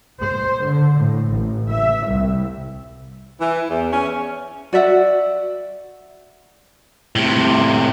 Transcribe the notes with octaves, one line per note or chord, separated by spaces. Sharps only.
C5
D3
A2
A1
E5
C2
E3
E2
C#4
F#4 D5 E5 F#5
A2 C3